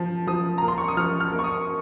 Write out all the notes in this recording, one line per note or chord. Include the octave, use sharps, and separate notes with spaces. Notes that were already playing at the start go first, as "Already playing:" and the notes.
Already playing: F3
F3 D#6
A#3 A#5
C6
C#6
D#6
F3 F6
F6
A#3
C#6
D#6